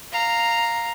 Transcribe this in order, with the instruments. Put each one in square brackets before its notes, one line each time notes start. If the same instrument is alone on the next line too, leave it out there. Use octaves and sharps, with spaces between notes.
[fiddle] F5 A#5